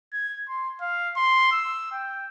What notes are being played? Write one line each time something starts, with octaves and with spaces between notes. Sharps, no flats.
G#6
C6
F5
C6
E6
G5